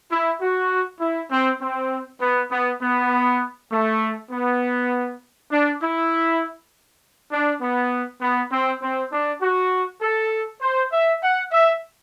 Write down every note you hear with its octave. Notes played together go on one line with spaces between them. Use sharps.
E4
F#4
E4
C4
C4
B3
B3
B3
A3
B3
D4
E4
D4
B3
B3
C4
C4
D4
F#4
A4
C5
E5
F#5
E5